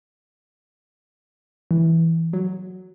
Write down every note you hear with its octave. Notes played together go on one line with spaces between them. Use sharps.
E3
F#3